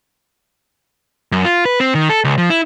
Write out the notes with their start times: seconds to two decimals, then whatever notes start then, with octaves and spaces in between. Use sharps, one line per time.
1.32 F#2
1.45 F4
1.65 B4
1.80 C4
1.95 D#3
2.10 A4
2.24 C#2
2.38 F3
2.50 E4